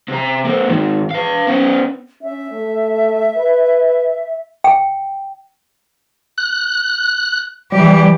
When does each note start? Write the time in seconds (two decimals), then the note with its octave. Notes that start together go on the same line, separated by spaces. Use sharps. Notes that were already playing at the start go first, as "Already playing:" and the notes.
0.08 C3 A#5
0.45 A#3 C4
0.68 G#2 D#3
1.11 B4 F5
1.47 B3 C#4
2.22 C#4 E5
2.52 A3
3.37 B4
4.64 G5
6.38 F#6
7.72 E3 G3 G4